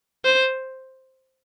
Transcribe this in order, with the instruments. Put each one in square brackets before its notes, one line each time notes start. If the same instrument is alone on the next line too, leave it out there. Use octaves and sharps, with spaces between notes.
[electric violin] C5